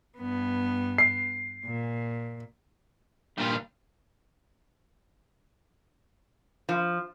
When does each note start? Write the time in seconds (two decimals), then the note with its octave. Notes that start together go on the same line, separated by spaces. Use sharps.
0.18 G2 B3
0.98 C7
1.65 A#2
3.38 G2 A#2 D#3 G3 F4
6.69 F3